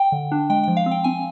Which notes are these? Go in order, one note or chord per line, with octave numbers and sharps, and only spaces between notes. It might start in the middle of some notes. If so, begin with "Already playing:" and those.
Already playing: G5
D3
D4
G#3 G5
F3 G5
F5
C4
G5
C4 G#5